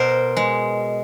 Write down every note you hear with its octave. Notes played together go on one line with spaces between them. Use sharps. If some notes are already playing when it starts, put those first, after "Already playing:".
Already playing: B2 A#4 C5
G#3